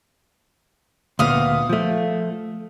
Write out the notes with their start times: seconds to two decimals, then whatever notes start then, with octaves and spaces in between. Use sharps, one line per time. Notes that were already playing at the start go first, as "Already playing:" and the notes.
1.19 D2 A#2 B3 F5 D#6
1.69 F3 A3